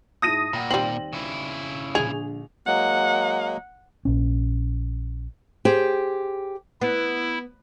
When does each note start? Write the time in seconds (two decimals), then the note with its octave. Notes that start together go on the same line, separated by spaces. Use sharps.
0.22 G#2 E4 A5 D#6 A#6 D#7
0.53 A#2 F#5 G5 B5
0.70 D#2 G3 C4 F#7
1.13 C#3 E4
1.95 A#1 D3 G#4 C#6 F7
2.67 F#3 G#3 A#3 F#5
4.05 A#1 C#4
5.65 G4 G#4 C5 G5
6.81 B3 E4